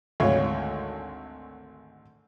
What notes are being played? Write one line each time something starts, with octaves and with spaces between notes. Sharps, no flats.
G#1 D2 C#5 F5